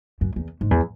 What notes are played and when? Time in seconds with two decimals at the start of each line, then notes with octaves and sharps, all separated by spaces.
0.21 F#2
0.36 E2
0.61 G#2
0.71 E2